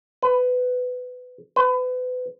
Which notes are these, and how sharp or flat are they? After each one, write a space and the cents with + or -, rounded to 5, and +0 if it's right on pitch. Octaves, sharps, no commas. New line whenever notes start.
B4 +20
B4 +35